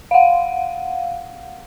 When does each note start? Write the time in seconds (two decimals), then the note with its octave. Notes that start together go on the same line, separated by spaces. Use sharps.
0.11 F5 F#5